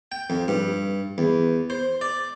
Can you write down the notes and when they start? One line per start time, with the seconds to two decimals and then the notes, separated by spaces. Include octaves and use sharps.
0.12 G5
0.30 F2
0.48 G2
1.18 E2
1.70 C5
2.01 D5